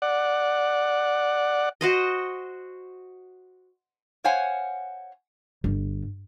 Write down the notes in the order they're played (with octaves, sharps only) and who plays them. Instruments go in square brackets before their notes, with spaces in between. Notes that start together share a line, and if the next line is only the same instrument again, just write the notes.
[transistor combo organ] D5 F#5
[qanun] F#4 C5 D#5
[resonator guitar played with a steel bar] C5 C#5 F5 F#5 G#5
[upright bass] G1